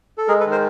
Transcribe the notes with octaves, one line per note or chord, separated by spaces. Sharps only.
A4
G#3 G#4 A#4
A4 B4
D#3
A#4 C5